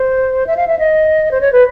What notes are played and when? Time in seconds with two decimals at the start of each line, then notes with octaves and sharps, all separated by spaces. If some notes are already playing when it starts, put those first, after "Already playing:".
Already playing: C5
0.47 E5
0.57 F5
0.68 E5
0.79 D#5
1.31 C5
1.41 C#5
1.53 B4